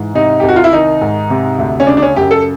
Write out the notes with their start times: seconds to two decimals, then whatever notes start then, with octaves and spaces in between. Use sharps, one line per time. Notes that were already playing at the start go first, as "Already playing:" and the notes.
Already playing: G#2 E3
0.14 C3 D#4
0.40 G4
0.43 C2
0.49 F#4
0.56 F4
0.64 E4
0.73 D#3 D#4
1.01 G#2
1.30 C3
1.59 D2
1.80 C#4
1.87 C#3 D4
1.97 D4
2.02 C#4
2.16 F#2 G4
2.31 A4